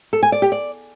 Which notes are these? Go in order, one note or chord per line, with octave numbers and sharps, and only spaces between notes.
A4
G#5
D5
G4
D5